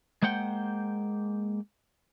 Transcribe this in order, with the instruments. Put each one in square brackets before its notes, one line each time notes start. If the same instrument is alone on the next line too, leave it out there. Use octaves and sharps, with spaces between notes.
[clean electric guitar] G#3 A#3 C5 F#5 G5